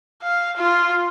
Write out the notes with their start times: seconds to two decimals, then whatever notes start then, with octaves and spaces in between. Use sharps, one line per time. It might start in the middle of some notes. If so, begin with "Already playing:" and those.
0.23 F5
0.57 F4